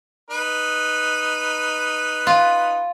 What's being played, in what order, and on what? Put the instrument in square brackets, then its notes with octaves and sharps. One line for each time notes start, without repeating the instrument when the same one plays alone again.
[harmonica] D#4 B4
[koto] F4